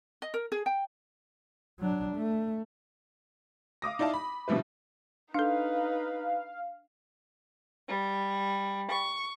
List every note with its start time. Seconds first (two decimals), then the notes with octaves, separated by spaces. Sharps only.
0.22 D#5
0.34 A#4
0.52 G#4
0.66 G5
1.79 F#3 D4
2.16 A3
3.82 F5 D6 D#6 A#6
3.99 D#4 E4 D5 F5 A5
4.14 B5
4.48 B2 D3 F3 G3 E4 B4
5.34 D4 D#4 A4 B4 F5
7.88 G3
8.91 C#6